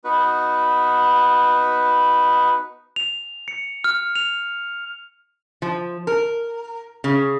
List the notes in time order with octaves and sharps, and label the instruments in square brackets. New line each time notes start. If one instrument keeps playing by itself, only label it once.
[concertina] B3 D#4 F#4 B4
[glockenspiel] F7
C#7
F6
F7
[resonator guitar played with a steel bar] F3
A#4
C#3